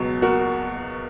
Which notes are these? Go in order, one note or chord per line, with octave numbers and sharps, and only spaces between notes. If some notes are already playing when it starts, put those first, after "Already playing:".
Already playing: C#2 B2 F#3
F#4 A#4